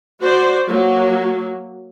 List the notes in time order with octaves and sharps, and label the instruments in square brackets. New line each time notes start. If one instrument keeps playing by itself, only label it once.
[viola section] F#4 C5 D5
F#3 A#3